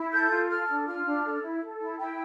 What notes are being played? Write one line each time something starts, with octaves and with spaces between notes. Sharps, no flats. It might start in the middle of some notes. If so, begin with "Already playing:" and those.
Already playing: E4
A4 G6
F4
A4 F6
D4
F4 F6
D4
A4
E4
A4
E4
E4 G5